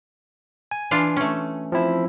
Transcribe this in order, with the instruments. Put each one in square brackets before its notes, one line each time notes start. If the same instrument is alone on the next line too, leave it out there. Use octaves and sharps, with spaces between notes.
[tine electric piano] G#5
[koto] E3 D4 F4
A3 C#4
[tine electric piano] F3 C4 E4